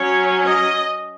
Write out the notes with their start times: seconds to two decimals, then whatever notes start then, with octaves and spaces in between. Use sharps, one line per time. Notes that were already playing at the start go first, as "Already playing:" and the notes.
Already playing: F#3 C#4 C#5
0.45 D#5